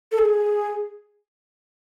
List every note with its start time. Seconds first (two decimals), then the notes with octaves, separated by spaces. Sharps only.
0.12 A4
0.19 G#4